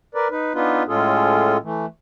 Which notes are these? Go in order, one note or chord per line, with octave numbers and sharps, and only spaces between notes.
A#4 B4 D5
D#4 B4
B3 D4 D#4 F4 B4
A2 G#3 C#4 F4 G#4 A4
E3 A3